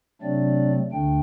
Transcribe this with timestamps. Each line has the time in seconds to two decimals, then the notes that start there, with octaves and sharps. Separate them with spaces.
0.22 C3 F#3 A3 C4 D4 D5
0.92 D2 D3 A3 D4 G5